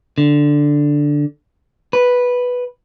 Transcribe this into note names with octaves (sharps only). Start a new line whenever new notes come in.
D3
B4